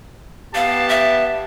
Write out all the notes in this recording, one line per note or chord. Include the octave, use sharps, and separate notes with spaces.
B3 G4 F5 A5
E5